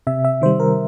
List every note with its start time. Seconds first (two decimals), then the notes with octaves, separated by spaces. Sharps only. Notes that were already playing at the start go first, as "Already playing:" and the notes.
0.07 C3 E5
0.25 E5
0.42 D#3 G3 C5
0.60 A#4